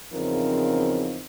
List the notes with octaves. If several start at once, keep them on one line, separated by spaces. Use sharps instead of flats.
E2 C#3 F3 C4 D#4 A#4